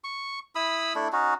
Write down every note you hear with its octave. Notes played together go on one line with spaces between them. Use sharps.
C#6
E4 B5 D#6 E6
A3 D4 E4
C#4 D#4 F#4